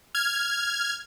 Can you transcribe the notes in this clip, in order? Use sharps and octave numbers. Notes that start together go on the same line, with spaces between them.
F6 G#6